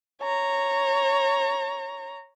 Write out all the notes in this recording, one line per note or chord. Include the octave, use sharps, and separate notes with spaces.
C#5 A#5